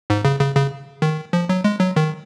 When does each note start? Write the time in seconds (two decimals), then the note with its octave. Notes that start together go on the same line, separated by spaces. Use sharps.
0.10 G#2
0.25 C#3
0.41 C#3
0.56 C#3
1.02 D#3
1.33 F3
1.49 F#3
1.64 G#3
1.80 F#3
1.96 D#3